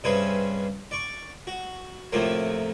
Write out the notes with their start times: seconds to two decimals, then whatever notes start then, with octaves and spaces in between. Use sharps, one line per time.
0.04 G2 C3 C4 C#4 G#4 B4
0.91 D5 C#6
1.47 F#4
2.12 A2 C3 F3 A3 A#3